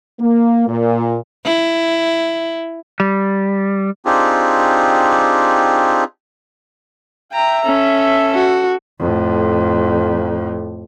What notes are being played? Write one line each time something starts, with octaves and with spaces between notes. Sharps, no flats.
A#3
A#2
E4
G3
C4 D4 D#4 F4 G4 G#4
E5 G5 A#5
C#4 A4
F#4
F2 A2